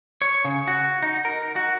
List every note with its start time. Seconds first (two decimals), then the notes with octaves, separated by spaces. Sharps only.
0.22 C#5
0.45 C#3
0.68 F#4
1.03 D#4
1.25 A#4
1.56 F#4